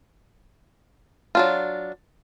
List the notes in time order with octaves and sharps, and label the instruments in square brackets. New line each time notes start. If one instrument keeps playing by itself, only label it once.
[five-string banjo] F#3 D4 F4